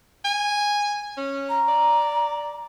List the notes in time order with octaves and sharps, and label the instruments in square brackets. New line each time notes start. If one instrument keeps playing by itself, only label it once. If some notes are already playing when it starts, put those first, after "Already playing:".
[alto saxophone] G#5
C#4
[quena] A#5
[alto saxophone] D5